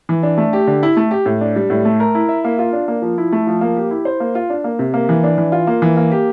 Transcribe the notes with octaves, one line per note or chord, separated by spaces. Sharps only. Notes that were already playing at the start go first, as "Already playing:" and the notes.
E3
D4
A3
G4
D3
E4
A3
G4
A2
D4
G3
A2
A3
A#4
E4
E5
A#3
F4
D4
A#3
F3
E4
A3
F3
A#3
G4
E4
C5
A#3
F4
D4
A#3
C3
A#3
E3
D4
E3
F4
A#3
E3
A#3
G4